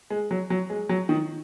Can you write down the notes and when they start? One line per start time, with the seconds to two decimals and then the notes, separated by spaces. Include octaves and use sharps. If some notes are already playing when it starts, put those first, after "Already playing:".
0.10 G#3
0.31 F#3
0.50 F#3
0.70 G#3
0.89 F#3
1.09 D#3